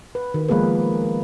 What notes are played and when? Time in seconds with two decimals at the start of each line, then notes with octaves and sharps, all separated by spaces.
0.15 B4
0.34 D#3
0.49 F3 G#3 A#3 B3 G#4 B4